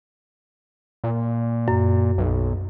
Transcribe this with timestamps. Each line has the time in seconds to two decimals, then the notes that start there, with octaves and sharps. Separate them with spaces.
1.04 A#2
1.68 F#2
2.18 B1